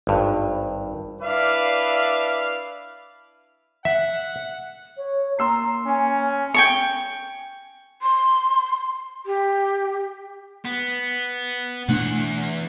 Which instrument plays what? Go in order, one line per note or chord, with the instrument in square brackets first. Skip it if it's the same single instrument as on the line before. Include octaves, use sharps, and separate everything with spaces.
[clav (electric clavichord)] G#1 G2
[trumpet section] D4 E4 B4 D5 E5 F5
[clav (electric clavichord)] E5 [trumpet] F#5
[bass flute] C#5
[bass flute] A#3 [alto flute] A#5 [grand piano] C6 E6 C7
[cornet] C#4 [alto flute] G#5
[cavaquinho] G5 G#5 C#6
[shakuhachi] C6
G4
[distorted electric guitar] B3
[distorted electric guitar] E2 F#5 [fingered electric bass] B2 A3 D4